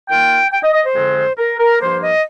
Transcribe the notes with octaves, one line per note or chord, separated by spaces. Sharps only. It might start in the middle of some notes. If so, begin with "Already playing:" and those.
D#3 A#3 F4 G5
G5
D#5
D#5
C5
F2 D3 G#3 C4
A#4
A#4
G2 F3 A#3 C5
D#5